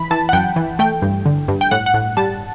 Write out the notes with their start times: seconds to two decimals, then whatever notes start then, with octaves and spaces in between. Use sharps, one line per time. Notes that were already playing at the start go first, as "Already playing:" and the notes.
Already playing: E3 B5
0.11 E3 A5
0.29 F#5
0.33 F#2 G5
0.56 E3
0.79 A3 G5
1.02 G2
1.26 D3
1.48 G2
1.61 G5
1.71 A2 F#5
1.86 F#5
1.94 A2
2.17 G3 A5